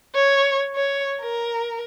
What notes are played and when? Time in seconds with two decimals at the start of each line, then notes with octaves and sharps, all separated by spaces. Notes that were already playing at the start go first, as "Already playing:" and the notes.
0.15 C#5
0.75 C#5
1.21 A#4